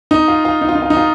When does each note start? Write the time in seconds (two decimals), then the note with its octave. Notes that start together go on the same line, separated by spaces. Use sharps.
0.11 D#4
0.28 F4
0.45 F4
0.62 D#4
0.69 F4
0.75 D#4
0.82 F4
0.90 D#4
0.97 F4